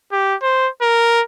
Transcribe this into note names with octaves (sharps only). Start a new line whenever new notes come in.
G4
C5
A#4